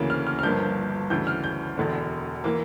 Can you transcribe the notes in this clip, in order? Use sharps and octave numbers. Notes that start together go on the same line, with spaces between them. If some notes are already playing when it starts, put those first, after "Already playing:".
Already playing: D2 C#3 E3 A#3
F6
F6
F6
G1 G2 F3 A#3 G6
D2 C#3 E3 G6
F6
G6
E1 E2 D3
E3 A#3